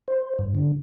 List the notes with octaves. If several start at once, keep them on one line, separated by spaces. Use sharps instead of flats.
C5
G2
D3